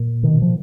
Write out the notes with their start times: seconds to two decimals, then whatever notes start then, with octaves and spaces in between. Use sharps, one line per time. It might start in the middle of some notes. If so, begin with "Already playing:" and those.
Already playing: A#2
0.23 B2 D#3
0.42 F3